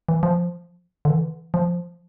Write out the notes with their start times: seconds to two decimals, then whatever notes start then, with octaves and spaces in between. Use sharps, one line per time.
0.09 E3
0.23 F3
1.05 D3
1.10 E3
1.54 F3